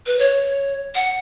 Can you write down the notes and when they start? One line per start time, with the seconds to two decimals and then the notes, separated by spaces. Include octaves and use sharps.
0.06 B4
0.19 C#5
0.95 F#5